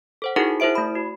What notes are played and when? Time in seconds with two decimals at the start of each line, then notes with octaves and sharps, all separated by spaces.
0.22 A4 C5 F#5
0.36 D#4 E4 F#4 G#4 A#4 F#5
0.60 E4 A#4 C5 E5 D7
0.75 A3 B5
0.95 F#4